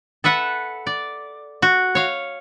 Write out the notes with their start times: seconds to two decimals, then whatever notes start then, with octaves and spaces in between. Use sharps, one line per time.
0.24 A4 B4 E5 F#5
0.87 D5
1.62 F#4
1.95 C#5 F5